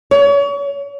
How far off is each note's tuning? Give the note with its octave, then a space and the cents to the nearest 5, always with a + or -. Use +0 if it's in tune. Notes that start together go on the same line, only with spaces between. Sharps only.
C#5 +35